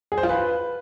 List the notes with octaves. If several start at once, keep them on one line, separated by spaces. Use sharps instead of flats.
G#4
C5
F4
B4